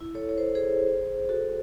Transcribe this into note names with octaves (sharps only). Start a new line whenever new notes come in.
E4
A4 C#5
C#5
C5
A4
G#4 C5
F#4 A4